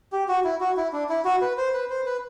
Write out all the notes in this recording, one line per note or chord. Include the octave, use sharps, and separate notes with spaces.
G4
F#4
E4
F#4
E4
D4
E4
F#4
B4
C5
B4
C5
B4